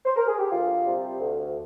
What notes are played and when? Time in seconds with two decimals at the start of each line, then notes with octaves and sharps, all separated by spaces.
0.05 C5
0.16 A#4
0.27 G#4
0.39 G4
0.51 D2 F4
0.85 C3 G3 C4
1.20 D2